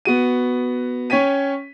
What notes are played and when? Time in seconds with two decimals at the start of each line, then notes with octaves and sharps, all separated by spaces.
0.05 B3 F#4 D#7
1.10 C#4 C#5 G5 B6 D#7